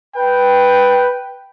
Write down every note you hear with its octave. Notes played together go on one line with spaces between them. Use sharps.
B4 G5